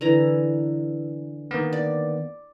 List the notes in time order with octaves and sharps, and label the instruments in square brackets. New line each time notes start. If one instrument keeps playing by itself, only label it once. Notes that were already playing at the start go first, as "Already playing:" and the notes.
[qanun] D3 E3 A#5
[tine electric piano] D#3 A#3 B3
[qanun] D5